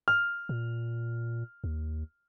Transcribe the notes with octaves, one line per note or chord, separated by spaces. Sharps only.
F6
A#2
D#2